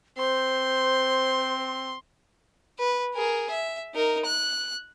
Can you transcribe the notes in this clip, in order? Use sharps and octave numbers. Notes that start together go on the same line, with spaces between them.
C4 C5 C6
B4
G#4 A#4
E5
D#4 A#4
F#6